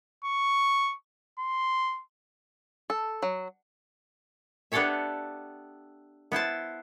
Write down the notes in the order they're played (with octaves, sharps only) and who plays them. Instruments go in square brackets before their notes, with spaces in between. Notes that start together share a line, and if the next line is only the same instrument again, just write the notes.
[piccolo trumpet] C#6
C6
[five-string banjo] A4
F#3
[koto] B3 D4 G4 A4 C#5 E5
B3 E4 C5 A5